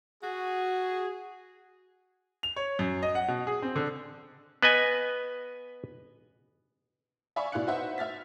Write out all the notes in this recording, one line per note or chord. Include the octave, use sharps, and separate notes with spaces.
F#4 G#4
F7
C#5
F#2
D#5
F#5
B2
G#4
C4
D3
B3 B4 D#5 G#5
D5 E5 F5 G#5 B5 C#6
B2 E4 D5 F5 F#6 C#7
D#4 F#4 B4 C5 E5 F#5
E5 F6 A6 B6